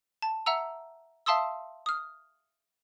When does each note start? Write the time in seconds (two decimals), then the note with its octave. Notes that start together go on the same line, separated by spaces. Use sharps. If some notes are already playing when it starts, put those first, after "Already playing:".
0.22 A5
0.46 E5 F#5 A#5 E6
1.26 E5 F5 A5 C6 D#6 E6
1.86 D#6 F6